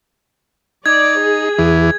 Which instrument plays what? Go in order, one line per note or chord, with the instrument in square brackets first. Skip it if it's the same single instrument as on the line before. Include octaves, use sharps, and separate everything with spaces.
[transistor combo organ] D#4 [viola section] D5 [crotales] G#6
[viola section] G#4
[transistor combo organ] E2 E3